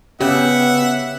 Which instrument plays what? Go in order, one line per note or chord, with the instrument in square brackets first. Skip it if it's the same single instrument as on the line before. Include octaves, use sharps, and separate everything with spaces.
[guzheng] C#3 [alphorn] B3 [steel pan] G4 [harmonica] E5 F#5